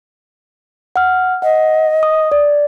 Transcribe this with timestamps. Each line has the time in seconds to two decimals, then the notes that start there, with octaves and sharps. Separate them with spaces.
0.96 F#5 F6
1.42 D#5 F#5
2.03 D#6
2.32 D5